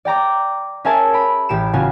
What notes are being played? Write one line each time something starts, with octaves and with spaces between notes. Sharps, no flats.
D5 G5 A#5 D6
C#4 G#4 A#4 E5 G#5 A5
B5 D7
A1 G4 D7 E7
C#3 C#4 F4 F#4 G#5